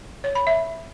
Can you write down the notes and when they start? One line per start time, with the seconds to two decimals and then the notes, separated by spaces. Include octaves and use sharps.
0.24 C#5
0.35 B5
0.47 E5